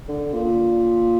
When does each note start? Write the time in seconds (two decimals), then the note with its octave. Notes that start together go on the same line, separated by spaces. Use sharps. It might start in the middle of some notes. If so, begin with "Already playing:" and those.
0.09 D3
0.34 A#2